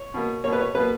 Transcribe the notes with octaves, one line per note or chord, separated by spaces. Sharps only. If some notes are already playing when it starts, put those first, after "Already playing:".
Already playing: C#5
B2 A#3
B2 A#3 C#5
B4
C#5
B2 A#3 B4